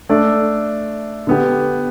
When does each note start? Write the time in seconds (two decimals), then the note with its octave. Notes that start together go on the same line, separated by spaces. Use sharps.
0.09 A3 D4 A4 D5
1.27 D3 B3 G4